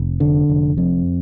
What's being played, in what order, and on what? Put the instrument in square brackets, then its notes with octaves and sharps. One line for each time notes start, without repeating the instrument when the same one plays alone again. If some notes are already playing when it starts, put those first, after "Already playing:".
Already playing: [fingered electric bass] F1
D3
F1
F2